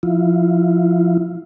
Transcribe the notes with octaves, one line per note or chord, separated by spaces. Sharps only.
F3 E4 F4